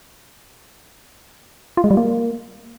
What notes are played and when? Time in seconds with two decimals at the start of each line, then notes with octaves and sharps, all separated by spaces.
1.77 F4
1.84 G#3
1.91 G3
1.97 A#3